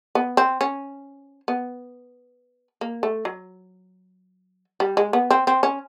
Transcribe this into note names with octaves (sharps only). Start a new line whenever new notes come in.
B3
C4
C#4
B3
A#3
A3
F#3
G3
G#3
B3
C4
C4
C#4